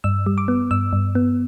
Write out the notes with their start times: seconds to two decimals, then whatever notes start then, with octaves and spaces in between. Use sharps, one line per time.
0.04 G2 E6
0.26 G3
0.38 D6
0.48 B3
0.71 G2 E6
0.93 G2
1.15 B3